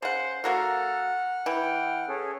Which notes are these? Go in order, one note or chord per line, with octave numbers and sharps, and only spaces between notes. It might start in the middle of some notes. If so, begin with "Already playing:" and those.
C#3 C5 F#5
F#3 A#3 F#4 A4 F#5 F6
E3 G5
C#4 G#4 A4